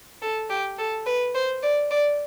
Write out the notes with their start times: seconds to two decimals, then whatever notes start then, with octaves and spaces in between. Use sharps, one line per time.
0.22 A4
0.50 G4
0.78 A4
1.06 B4
1.35 C5
1.63 D5
1.91 D5